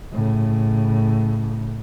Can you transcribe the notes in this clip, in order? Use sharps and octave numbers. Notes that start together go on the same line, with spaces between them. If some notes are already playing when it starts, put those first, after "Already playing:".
A2 C#3